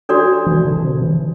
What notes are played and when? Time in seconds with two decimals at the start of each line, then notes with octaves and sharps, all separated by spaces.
0.09 D4 F#4 A4 D5
0.46 E3
0.65 D3
0.77 D3
0.83 C3
1.02 E3